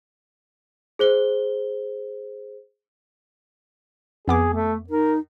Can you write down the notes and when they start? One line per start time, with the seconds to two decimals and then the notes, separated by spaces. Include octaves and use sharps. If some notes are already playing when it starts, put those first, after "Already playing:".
0.99 G#4 C5 G7
4.28 F2 B3 G#4 D6
4.54 A3
4.90 D#4 A#4